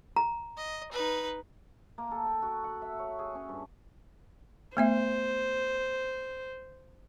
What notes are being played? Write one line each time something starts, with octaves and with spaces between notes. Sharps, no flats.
A#5
D#5
D#4 B4
A#3
A4
G5
F#4
F#5
E5
C#5
G#4
C#4
G2
A3 B3 C5 E5